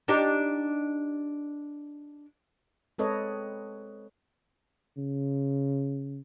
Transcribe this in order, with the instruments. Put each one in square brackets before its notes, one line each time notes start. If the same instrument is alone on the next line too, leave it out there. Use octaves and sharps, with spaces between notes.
[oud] D4 D#4 G4
[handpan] G#3 C4 A4 B4 C#5 D#5
[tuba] C#3